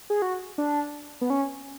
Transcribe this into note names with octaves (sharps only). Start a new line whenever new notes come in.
G#4
F#4
D4
B3
C#4